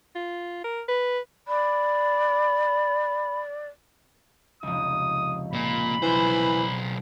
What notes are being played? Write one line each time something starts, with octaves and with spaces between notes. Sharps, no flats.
F4
A#4
B4
D5 B5
F1 C#2 D#6
A#2 A#3 B5
B1 E3 C5